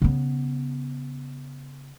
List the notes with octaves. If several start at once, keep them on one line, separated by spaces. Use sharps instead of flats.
C#3 B3